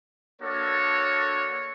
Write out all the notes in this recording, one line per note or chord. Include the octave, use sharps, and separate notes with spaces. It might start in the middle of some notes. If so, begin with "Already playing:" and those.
A#3 D4 F#4 A4 C#5